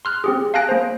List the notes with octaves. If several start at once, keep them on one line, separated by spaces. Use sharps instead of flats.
C6 F6 F#6
C4 G4 G#4
F5 G#5 A5 F#6 A#6 D7
A#3 C5